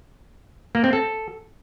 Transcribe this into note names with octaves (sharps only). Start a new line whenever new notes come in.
A#3
C4
A4